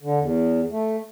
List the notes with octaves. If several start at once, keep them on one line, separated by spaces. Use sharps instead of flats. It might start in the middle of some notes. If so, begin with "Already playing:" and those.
D3
E2
A3